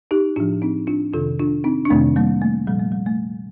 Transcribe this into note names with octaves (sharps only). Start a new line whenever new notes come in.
D#4 G4
A2 F3 D4 F4
C4 D#4
D4 F4
F2 C3 D#3 F4 A4
D4 F4
C4 D#4
D4
F2 C3 D#3 A3 C4
G3 A#3
A3
A#2 F3 G3
A3
G3
A3